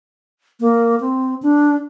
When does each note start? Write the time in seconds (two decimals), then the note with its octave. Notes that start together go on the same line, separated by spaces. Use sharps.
0.60 A#3
1.00 C4
1.42 D4